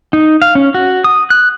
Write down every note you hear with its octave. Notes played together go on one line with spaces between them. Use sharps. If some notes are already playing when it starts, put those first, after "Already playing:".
D#4
F5
C#4
F#4
D#6
F#6